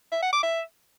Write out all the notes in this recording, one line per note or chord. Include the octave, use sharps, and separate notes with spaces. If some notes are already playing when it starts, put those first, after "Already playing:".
E5
F#5
D6
E5